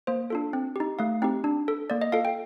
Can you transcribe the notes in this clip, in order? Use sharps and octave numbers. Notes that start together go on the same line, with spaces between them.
A#3 C5
D4 F4 A4
C4
D#4 G4
A3 F5
C4 D#4 G4
D4
A4
A#3 D5
D#5
F4 A4 F5
G5